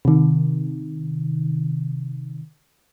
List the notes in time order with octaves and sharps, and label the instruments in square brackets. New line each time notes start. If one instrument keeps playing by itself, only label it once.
[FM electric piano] C3 D#3